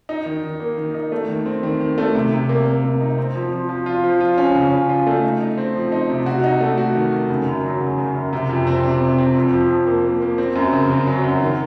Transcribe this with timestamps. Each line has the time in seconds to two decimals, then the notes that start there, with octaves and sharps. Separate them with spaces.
0.09 D#4
0.25 D#3
0.43 D#3
0.60 A#3
0.78 D#3
0.94 D#4
1.12 A3
1.29 D#3
1.46 C4
1.63 D#3
1.80 D#3
1.98 A3
2.15 C3
2.32 C3
2.49 A#3
2.66 A#3
2.84 C3
3.01 D#4
3.18 C4
3.35 F3
3.52 F3
3.69 F3
3.86 F4
4.04 F3
4.20 F4
4.38 C#4
4.55 C#3
4.72 C#4
4.89 F4
5.07 A3
5.23 D#4
5.41 D#4
5.58 C4
5.75 F3
5.92 D#4
6.10 C3
6.26 F#4
6.44 D#4
6.61 A3
6.78 F#4
6.95 D#3
7.12 D#3
7.30 C#3
7.46 F#2
7.63 F#3
7.81 C#3
7.98 C#3
8.15 F#2
8.33 C3
8.49 F2
8.67 C4
8.83 C3
9.01 C3
9.18 C4
9.36 F2
9.53 F3
9.69 F2
9.87 A#3
10.04 A#3
10.22 A#3
10.38 C4
10.55 F#2
10.73 C#3
10.90 C#3
11.07 F#3
11.24 F#2
11.41 D#3